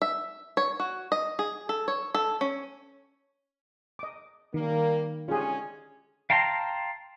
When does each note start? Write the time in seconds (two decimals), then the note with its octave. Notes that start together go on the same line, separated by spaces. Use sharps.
0.02 E5
0.57 C#5
0.80 F#4
1.12 D#5
1.39 G#4
1.69 A4
1.88 C#5
2.15 A4
2.41 C#4
3.99 D#5 D6
4.54 D#3 G3 A#3
5.28 D3 G#3 C#4 F4 G4 G#4
6.30 F5 G5 A5 A#5 C6